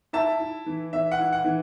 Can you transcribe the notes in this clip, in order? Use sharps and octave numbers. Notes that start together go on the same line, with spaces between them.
E4 E5 A5
E4
E3
E3 E5
F#5
E4
F#5
E3